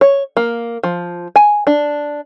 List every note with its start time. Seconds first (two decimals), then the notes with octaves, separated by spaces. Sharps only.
0.01 C#5
0.37 A#3
0.83 F3
1.36 G#5
1.67 D4